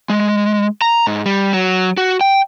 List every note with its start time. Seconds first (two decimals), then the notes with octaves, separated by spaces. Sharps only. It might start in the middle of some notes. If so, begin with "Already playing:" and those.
0.10 G#3
0.82 A#5
1.07 G#2
1.26 G3
1.53 F#3
1.97 F#4
2.21 G5